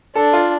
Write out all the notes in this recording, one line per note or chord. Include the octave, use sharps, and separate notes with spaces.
D4 A4
F4